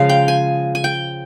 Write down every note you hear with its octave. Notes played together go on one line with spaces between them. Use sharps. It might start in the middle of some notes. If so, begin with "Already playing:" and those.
Already playing: C#3 F3 G#3 F5
G5
G#5
G#5
G5